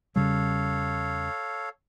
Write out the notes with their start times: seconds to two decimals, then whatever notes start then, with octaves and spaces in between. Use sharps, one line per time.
0.16 E2 C#3 G3 A4 C#5 F5